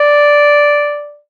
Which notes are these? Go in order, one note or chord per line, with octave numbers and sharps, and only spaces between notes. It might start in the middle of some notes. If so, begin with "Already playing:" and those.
Already playing: D5